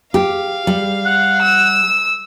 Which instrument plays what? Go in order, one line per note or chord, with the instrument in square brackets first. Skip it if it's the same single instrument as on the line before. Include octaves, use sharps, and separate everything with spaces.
[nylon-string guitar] G4 [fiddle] F5
[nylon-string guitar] G3
[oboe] F#5
[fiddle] E6